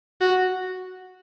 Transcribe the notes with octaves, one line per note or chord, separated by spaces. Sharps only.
F#4